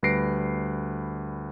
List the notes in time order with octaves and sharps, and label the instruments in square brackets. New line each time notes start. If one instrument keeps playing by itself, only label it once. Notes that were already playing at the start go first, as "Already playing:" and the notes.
[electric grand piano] D2 G3 B4 A#6 C7 D7